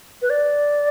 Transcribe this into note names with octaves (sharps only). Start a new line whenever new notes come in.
B4
D5